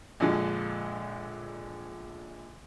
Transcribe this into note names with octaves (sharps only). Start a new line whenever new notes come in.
A#1 F2 D3 F3 G#3